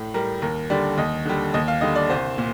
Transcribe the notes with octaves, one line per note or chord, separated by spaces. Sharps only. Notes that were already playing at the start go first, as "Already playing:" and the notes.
Already playing: A2
G3 A#4
D#2 A#4
D3 G3 D5
D#2 D#5
D3 G3
D#2 D#5
F5
D3 G3 D#5
D5
C2 C5
A#2